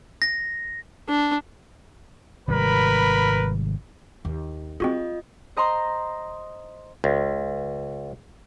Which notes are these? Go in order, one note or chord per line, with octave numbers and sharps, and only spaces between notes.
A#6
D4
G#1 C3 G3 A#4 B4 B5
D#2
G3 C4 F4 F#4 G#4 D#5
C5 D#5 A#5 C6
C#2